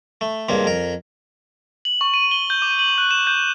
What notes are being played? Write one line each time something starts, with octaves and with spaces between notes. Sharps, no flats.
A3
C#2 G2 A#3 C4
F2 A#4
F#7
C#6
D#7
G7
G6
D6
F#7
F#6
E7
G6